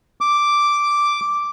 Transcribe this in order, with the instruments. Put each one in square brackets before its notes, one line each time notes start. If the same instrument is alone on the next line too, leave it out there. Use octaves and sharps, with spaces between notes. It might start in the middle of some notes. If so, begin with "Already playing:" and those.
[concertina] D6